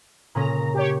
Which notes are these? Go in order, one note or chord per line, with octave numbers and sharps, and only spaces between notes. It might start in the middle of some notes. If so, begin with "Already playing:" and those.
A#2 C#3 C#4 A#5
G4 C#5